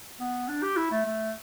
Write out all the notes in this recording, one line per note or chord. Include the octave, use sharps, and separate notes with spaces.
B3
D4
G4
E4
A3
A3